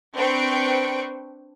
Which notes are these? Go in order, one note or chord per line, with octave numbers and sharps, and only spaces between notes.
C4 D4 B4 G5 C#6 D7